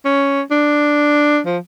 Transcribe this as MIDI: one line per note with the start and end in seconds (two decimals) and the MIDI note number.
0.05 0.41 61
0.51 1.40 62
1.46 1.58 53